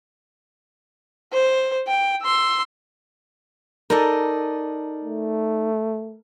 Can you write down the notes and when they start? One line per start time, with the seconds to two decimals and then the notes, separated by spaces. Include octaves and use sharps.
1.33 C5
1.88 G5
2.22 C6 E6
3.90 D#4 A4 A#4 D5 D#5
5.04 A3